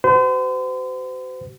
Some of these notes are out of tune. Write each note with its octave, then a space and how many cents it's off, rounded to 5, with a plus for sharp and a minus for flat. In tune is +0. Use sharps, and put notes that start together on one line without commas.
F#4 +35 C5 -40